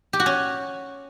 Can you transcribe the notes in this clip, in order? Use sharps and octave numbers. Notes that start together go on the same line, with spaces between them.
G4
F#4
C#4